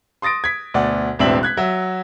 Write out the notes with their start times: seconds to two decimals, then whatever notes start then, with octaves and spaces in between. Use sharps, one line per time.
0.22 C6 D#6 A6 A#6 D7
0.44 G#6 B6
0.74 D2 B2 D5 F#5
1.19 E1 A1 C4 D4 E5 F#7
1.43 F#6 G#6 B6
1.57 F#3 E5